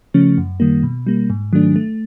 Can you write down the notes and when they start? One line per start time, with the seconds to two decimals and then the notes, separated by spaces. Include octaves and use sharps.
0.14 C#3 F3 A3 C#4
0.38 F#2
0.60 D#3 G3 A#3
0.83 B2
1.07 G3 A#3
1.30 G#2
1.53 D#3 F#3 A3 D4
1.76 A3